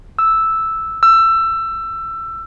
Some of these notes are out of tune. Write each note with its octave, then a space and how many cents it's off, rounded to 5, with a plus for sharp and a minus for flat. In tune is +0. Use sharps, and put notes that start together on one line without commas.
E6 -5
E6 +20